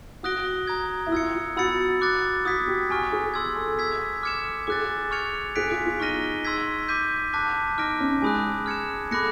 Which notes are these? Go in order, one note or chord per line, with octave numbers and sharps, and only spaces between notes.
F#4 D#6 F#6 A#6 D7 G7
A#5 D#6 G#6
E4
F4 E6 G#6 C#7
F4
F#4 B5 E6 A6 C#7
D6 F#6 A6
F#4 D#6 G#6 B6
G4
G#5 C#6 F6
G#4
C6 E6 G#6
A4
E6 G#6 B6
D6 F6 G#6 C#7 E7
G#4 D6 F#6 A6
C#6 F6 G#6 C#7 F7
G#4 F#6 B6 D7
F4
F4
D#4 C#6 F6 A#6 D#7 G7
C6 E6 G#6 B6
D6 G6 B6 D#7
A5 D6 F#6 B6
D#4 D6 F6 A#6 D7
C#4
G#3 G#5 B5 D#6 F#6
F6 G#6 C#7 E7
A3 B5 D6 F#6 A#6 C#7